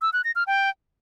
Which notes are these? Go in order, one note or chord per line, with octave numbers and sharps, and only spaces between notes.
E6
F#6
A#6
F6
G5